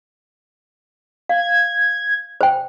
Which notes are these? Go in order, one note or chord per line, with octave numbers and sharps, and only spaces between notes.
F5 G#6
C5 G5